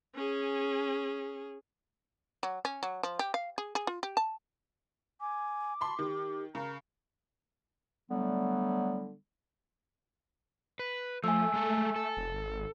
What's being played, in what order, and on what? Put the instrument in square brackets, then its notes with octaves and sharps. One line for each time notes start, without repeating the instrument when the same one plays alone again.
[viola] C#4 G#4
[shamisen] F#3
C#4
F#3
F3
G4
F5
G#4
G#4
F4
G4
A5
[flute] G#5 [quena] D6
[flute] A5 [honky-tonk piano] B5 C6
[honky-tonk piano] D#3 [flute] G4
[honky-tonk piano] C#3 [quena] A#4 [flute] A#5
[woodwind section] D3 F#3 G3 A3 B3
[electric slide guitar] B4
[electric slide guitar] F3 [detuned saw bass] A3 [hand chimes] G#5 E6
[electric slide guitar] G#3 A4
A4
[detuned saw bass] F1
G#1